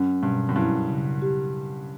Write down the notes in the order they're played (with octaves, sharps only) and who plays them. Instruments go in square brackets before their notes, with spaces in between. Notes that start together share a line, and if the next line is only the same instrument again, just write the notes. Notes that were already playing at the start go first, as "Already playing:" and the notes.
Already playing: [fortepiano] F#2 [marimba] C#4
[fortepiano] G2 [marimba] B2
[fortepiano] F#2
[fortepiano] G2 [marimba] E4
[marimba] C#3
G4